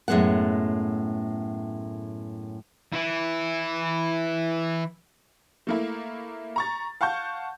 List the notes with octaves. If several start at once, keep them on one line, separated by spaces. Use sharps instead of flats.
F#2 A2 C3 G#3 B3 F#5
E3 E4
A3 A#3 E4
A#5 C#6 A6
F5 F#5 A5 C#6 G6